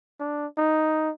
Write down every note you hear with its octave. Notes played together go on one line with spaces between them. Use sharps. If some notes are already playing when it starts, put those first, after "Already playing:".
D4
D#4